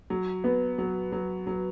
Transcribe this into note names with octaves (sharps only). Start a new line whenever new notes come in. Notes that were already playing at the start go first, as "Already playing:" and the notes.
F#3
B3
F#3
F#3
F#3